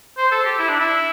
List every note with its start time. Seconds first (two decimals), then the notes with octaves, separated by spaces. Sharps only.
0.18 C5
0.32 A4
0.45 G4
0.59 E4
0.69 D4
0.79 E4